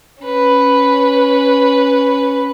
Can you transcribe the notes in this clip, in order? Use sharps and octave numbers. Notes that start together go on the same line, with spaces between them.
C#4 B4